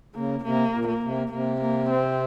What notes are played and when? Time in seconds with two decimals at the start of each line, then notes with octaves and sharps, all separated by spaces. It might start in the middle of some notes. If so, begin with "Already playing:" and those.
0.15 C#3 A#3
0.44 C3 A#3
0.73 A#2
0.88 A#3
1.03 C3
1.32 C3 A#3
1.61 A#3
1.90 C4